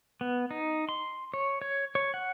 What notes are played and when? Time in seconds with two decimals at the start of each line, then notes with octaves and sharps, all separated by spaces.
0.21 B3
0.51 D#4
0.89 C6
1.34 C#5
1.62 C#5
1.95 C#5
2.14 F#5